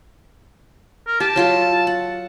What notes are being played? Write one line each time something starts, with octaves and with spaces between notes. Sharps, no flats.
A#4
G4 A5
F#3 F4 A4
F#5